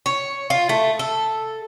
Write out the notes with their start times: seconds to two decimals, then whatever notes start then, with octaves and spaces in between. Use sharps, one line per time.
0.06 C#5
0.50 F4
0.69 A3
0.99 A4